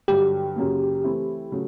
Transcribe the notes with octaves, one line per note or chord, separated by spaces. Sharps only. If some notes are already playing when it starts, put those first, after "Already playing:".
G2 D3 F#3 G4
F#2 C#3 F#3 A#3
E3 A3 C4 E4
C#3 F#3 A3